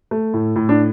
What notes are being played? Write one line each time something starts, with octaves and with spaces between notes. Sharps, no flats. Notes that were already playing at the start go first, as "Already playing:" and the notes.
A3
A2
A2
D4